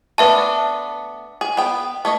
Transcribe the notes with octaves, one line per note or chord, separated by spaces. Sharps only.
A3 B3 D4 B4 E5 A5
G#4
B3 G5
A3 C#5 D#5